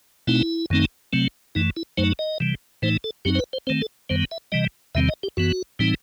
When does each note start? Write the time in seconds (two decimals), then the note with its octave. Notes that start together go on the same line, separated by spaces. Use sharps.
0.27 B2 A3 C4 D#4 E4
0.70 F#2 D#3 A3 C4 D#4
1.13 C3 F#3 A3 C4
1.55 F#2 E3 A3 D#4
1.77 E4
1.97 F#2 F#3 A3 D#4 C5
2.19 D#5
2.40 C3 E3 G3
2.82 A2 E3 A3 D#4 C5
3.04 A4
3.25 F#2 F#3 C4 D#4 G4
3.35 C5
3.39 B4
3.53 C5
3.67 D#3 A3 C4 C5
3.81 A4
4.09 F#2 D#3 G3 B3 C5
4.31 E5
4.52 C3 E3 G3 D#5
4.95 E2 C3 D#3 G3 C4 E5
5.09 D#5
5.23 G4
5.37 F#2 E3 B3 F#4
5.79 A2 E3 G3 C4 D#4